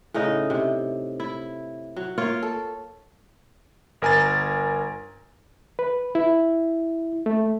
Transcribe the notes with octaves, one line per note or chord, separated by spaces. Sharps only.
A2 C#3 D#4 D#5
C3
E4
F#3
A#3 F4 C#5 F5
A4
G1 A#4 G#5 A#5 A6
B4
E4
A3